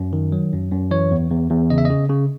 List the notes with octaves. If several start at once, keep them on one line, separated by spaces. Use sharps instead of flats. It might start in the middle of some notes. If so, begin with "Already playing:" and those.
Already playing: F#2
D#3
F#3
F#2
F#2
E3 C#5
E2
E2
E2
C#3 D#5
E5
C#3 D#5
C#3